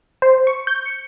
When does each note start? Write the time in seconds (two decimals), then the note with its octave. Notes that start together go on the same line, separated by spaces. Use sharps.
0.22 C5
0.47 C#6
0.67 G6
0.85 C#7